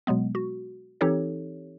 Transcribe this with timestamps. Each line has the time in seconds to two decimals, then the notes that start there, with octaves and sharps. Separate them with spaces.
0.07 B2 F#3 G#3 B3
0.35 F#4
1.01 E3 C4 D#4 G4 A4 C#5